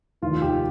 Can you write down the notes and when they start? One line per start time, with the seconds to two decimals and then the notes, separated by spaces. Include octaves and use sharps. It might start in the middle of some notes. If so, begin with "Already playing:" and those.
0.22 F1 D#2 D#3 F4
0.42 G4